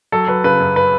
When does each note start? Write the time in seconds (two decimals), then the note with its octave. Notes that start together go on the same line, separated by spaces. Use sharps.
0.12 F#3 A4
0.28 F#3 B4
0.44 C#3 B4
0.60 F#2
0.76 B4